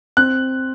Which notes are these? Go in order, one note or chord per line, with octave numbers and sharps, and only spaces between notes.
C4 F#6